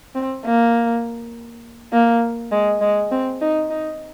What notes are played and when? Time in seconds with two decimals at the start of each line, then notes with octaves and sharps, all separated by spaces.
0.15 C4
0.45 A#3
1.93 A#3
2.51 G#3
2.81 G#3
3.11 C4
3.41 D#4
3.70 D#4